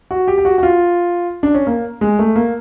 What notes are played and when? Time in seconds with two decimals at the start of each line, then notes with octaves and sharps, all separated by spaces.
0.11 F#4
0.28 G4
0.38 G4
0.45 F#4
0.58 F#4
0.63 F4
1.43 D4
1.55 C#4
1.67 A#3
2.01 G#3
2.19 A3
2.36 A#3